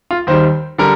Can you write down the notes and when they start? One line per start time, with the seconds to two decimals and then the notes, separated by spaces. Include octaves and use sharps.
0.11 F4
0.27 D#2 D#3 G3 C5
0.78 D3 G3 A#4